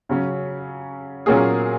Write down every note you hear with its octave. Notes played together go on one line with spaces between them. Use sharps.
C#3 F#3 C#4
A#2 F#3 A#3 C#4 G#4